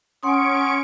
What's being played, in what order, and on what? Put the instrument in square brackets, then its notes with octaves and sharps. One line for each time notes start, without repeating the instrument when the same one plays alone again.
[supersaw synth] C#4 C#6 D7 [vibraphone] F#5 C6 D#6